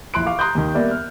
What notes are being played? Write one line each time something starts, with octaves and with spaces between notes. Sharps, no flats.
A#1 E4 C6 F#6 D7
F5 C#6 D6
A#5 C6 D#6 F#6 G6
D#2 D#3
G3 A#3 B3 A#4 D5 E5
F6